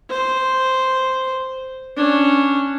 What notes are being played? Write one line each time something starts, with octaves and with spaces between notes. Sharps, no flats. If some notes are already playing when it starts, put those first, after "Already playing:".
C5
C#4 D4